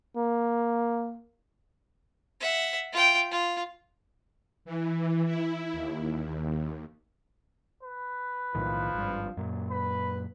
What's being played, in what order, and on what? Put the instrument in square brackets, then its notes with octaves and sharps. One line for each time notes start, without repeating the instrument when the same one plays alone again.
[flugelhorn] A#3
[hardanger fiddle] E5 F#5
F4 G5
F4
[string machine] E3
E4
D#2
[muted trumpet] B4
[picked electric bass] B1 A2 D#3 [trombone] F3
[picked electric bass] G#1 G2
F#2 A#2
[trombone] B4 [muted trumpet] B5